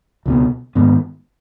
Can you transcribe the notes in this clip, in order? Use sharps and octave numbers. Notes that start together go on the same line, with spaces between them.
C#2 B2 B3
G#2 D#3 B3